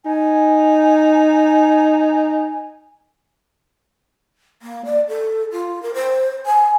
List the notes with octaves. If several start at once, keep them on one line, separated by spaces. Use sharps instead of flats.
D#4 G#5
A#3
D5
A4
F4
A#4
C5
G#5